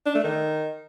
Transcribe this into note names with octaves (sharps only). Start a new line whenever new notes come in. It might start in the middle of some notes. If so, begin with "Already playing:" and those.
D4
A3
D#3